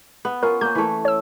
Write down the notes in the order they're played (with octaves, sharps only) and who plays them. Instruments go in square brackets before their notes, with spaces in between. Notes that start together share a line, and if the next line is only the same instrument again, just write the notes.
[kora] B3
[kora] C#4 F4 [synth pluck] A#4
[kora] A#3 C#4 [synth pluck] G6
[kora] E3 A3
[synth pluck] C#5 E6